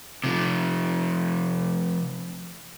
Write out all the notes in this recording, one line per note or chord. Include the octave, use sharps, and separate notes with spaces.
C3 F3